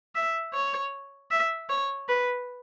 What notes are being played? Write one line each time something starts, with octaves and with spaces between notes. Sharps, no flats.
E5
C#5
E5
C#5
B4